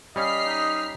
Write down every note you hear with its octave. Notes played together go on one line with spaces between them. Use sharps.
G3 C#4 D#5 F5 F6 B6 C7
D#4